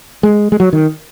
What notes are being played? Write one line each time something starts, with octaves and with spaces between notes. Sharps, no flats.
G#3
G#3
F#3
D#3